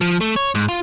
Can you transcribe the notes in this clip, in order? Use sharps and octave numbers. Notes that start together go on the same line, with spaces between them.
F3
A3
C#5
G#2
F4